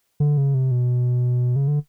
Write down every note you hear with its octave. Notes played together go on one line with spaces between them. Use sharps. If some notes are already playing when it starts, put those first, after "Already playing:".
D3
C#3
C3
B2
C#3
D3